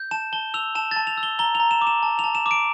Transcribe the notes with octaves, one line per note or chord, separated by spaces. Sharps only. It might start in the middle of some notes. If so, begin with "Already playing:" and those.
Already playing: G6
A5 E7
A5 G7
E6 F7
A5 E7
A6
A5
F7
E6
G7
A#5 G7
F7
A#5
E7
D6
E7
A5
F7
A5
E7
D6
D7